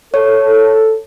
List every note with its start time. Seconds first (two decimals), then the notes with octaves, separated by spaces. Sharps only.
0.14 A4 C#5